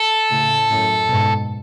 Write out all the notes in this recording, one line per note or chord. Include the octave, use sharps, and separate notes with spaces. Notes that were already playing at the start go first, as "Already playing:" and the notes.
Already playing: A4
A2 C#3
F#2 A2
G#2 B2